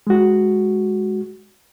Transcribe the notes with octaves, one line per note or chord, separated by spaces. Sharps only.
G#3 F#4